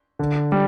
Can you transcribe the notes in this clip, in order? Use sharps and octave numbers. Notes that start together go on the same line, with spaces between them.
D3
G3